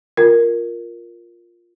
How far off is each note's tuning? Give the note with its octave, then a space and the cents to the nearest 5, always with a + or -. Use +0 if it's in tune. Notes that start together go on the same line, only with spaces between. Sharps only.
F4 +0 A#4 +0